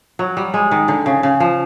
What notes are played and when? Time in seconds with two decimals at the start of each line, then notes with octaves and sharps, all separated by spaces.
0.19 F#3
0.37 G3
0.54 G#3
0.71 D#3
0.88 D3
1.06 C#3
1.23 C#3
1.40 F3